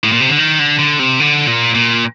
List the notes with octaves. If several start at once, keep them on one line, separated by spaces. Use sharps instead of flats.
A2
A#2
C3
D3
D#3
D3
D3
C3
D3
A#2
A#2